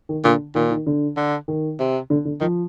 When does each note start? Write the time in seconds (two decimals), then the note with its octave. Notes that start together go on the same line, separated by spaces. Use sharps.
0.09 D#3
0.24 A#2 D3
0.55 A#2 D#3
0.71 D#3
0.87 D3
1.17 D3
1.48 D#3
1.79 C3
2.10 D3
2.25 D3
2.41 D#3 F3